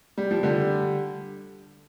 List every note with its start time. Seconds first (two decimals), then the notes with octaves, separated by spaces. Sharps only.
0.18 G3
0.31 F3
0.43 D3 G3